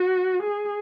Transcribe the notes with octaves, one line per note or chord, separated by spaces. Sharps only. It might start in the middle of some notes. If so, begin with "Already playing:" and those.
Already playing: F#4
G#4